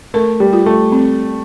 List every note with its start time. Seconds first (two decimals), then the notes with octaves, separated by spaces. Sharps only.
0.14 A3 A#4
0.40 G3
0.53 F4
0.66 A3
0.92 C4